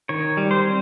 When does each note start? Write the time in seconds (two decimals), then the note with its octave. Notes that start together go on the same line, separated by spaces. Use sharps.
0.09 D#3 C#5
0.37 G3
0.51 C5
0.64 C4